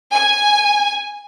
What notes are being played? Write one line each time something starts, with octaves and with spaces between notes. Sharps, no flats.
G#5